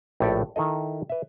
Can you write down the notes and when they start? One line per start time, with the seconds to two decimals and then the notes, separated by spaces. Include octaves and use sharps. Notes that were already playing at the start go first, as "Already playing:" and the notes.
0.20 A#1 A2 G4 A4 D5
0.56 D#3 E4 A4 D#5
1.10 B4 E5